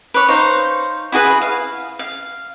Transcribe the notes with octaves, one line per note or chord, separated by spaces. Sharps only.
B4 C#5
D#4 C5 C#5 F5
E4 F#4 G#4 B4
F5
F5